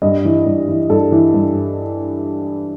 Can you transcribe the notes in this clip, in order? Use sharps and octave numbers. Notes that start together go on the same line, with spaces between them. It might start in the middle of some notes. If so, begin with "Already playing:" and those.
G2 D#5
E3
G2
E3
G2 A4
E3
G2